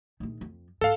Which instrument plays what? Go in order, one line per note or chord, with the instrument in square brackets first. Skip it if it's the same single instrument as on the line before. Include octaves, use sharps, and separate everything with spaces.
[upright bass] A#1 D#3
F2
[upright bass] G#2 [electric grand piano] A4 F5